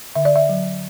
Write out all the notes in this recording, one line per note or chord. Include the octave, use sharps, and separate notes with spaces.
D3 E5
D5
E5
F#3